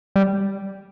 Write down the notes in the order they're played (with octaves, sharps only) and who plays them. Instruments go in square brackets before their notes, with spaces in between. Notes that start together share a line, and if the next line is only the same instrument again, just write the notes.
[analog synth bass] G3